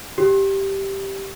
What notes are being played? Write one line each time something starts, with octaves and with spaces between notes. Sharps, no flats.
G4